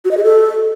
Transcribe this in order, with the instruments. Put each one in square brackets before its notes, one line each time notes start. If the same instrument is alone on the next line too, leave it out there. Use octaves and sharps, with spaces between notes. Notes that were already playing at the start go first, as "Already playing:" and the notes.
[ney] F#4
D#5
G#4
A4